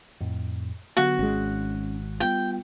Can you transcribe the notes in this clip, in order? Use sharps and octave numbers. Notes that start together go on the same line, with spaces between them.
F2 A2
D3 F#3 B3 F#4
G#1 G#3 C#4
G3 B3 F4 G5